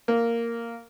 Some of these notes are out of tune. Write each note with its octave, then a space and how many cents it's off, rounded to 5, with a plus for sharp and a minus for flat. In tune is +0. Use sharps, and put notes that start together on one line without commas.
A#3 -5